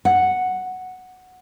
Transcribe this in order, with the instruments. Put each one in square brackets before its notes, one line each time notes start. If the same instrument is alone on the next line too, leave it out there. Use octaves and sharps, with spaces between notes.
[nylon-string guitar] F#5